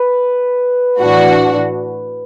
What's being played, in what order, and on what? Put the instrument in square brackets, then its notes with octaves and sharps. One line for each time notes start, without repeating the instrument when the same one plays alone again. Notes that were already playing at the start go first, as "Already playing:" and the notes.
Already playing: [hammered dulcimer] B4
[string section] A2 E3 D4 F#4